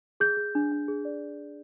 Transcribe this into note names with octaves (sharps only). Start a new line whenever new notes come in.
G#4 G6
G#4
D4
D4
G#4
D5